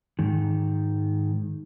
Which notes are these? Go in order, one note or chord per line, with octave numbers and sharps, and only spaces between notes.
G#2 D#3